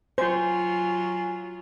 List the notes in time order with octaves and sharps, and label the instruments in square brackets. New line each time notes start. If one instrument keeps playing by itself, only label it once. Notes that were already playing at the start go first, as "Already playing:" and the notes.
[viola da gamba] F#3 F4 [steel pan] C5 [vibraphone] G#5